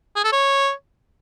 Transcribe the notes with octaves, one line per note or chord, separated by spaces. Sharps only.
G#4
A4
C#5